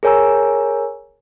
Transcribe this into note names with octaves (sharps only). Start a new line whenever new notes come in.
G#4 A#4 C#5 G#5 A#5 E6